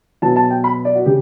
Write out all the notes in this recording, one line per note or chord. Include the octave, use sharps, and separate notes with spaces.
B2 F#3 B3 A5
A5
G5
B5
D5
F#4
C#3 G4